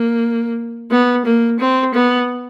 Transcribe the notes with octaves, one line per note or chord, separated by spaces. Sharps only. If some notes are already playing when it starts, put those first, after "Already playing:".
Already playing: A#3
B3
A#3
C4
B3